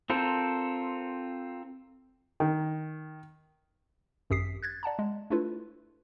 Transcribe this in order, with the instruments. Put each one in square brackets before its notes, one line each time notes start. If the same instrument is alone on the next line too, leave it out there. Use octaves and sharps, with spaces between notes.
[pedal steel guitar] C4 F4 A4 A#4 C5
[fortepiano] D#3
[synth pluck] G#1 F#2 G4 D#6 B6 C7
F#6 G#6 A6
D5 F#5 A5 A#5
G#3
A3 D4 E4 F4 A4 B4